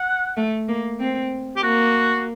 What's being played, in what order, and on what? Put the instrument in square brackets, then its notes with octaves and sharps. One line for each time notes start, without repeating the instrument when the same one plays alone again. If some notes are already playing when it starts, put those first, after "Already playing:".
Already playing: [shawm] F#5
[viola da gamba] A3
A#3
C4
[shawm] G4
[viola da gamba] A#3 [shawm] F#4